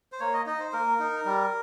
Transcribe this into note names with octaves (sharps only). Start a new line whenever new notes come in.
C5
A#3 C#5
D#5
D#4 D#5
C5
A#3 A#4
D#4
G3